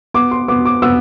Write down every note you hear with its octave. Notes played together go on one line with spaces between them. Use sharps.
B3 D6
C6
B3 D6
D6
B3 E6